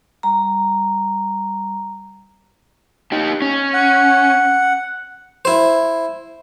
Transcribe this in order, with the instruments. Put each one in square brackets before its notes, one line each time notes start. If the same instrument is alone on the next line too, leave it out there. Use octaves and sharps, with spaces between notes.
[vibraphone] G3 A#5
[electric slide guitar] D#4 G4
C#4
[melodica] F#5
[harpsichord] E4 C5